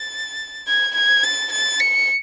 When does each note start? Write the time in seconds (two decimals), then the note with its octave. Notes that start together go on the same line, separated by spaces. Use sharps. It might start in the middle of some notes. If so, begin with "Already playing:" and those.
Already playing: A6
0.68 G#6
0.95 G#6
1.23 A6
1.52 A6
1.80 C#7